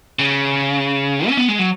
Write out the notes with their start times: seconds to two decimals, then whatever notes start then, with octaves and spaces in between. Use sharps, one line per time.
0.19 C#3
1.28 C#4
1.38 B3
1.48 G#3
1.59 F#3